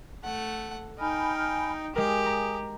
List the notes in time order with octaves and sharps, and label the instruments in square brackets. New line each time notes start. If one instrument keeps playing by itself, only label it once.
[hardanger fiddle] A3 F#5
[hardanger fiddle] D#4 G5 [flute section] G#5 B5 F6
[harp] G#3 A#4 [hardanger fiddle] G4 [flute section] G#4 G#5 D#6
[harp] A#5